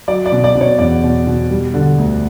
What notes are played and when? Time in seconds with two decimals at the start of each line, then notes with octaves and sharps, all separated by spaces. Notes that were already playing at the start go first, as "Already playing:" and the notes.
0.08 F#3 D5
0.26 D5
0.32 B2
0.44 D5
0.55 B2
0.61 C#5
0.79 E2 D5
1.04 B2
1.27 B2
1.50 G3
1.74 D3
1.98 D2